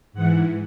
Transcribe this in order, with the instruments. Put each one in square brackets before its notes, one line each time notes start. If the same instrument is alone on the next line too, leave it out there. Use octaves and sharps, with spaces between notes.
[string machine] G#2 E3 F#5